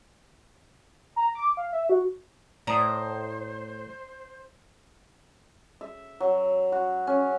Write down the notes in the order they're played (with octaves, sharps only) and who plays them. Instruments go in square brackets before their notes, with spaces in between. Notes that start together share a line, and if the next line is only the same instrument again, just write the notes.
[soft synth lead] A#5
D6
F5
E5
F#4
[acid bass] A2 [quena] C5 [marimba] D5 D#6 [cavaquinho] A#5
[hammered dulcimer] E5
F#3
F#4
C#4